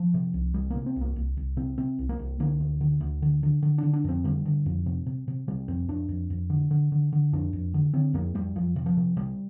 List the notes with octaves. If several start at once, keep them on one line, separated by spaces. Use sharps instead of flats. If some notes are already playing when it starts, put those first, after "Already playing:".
Already playing: F3
C3
C2
C2 G3
C3 A#3
C4
C2
A#3
C2
C2
C3 C4
C3 C4
C2
A#3
C2
D3 A#3
D2
D3
D2
D3
D3
D3
D3 D4
D4
F2 C4
D3 G3
D3
F2
C3
C3
C3
C3 G3
F2 C4
F2 D4
F2
F2
D3
D3
D3
D3
F2 D4
F2
D3
D3 C4
F2 A#3
F2 G3
F2 F3
C3
F3
C3
C3 G3